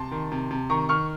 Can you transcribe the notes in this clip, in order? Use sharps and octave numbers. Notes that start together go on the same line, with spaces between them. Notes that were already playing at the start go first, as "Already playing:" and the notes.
Already playing: C3 A5 C6
D#3
C3
C3
D#3 A#5 C#6
D#3 C#6 F6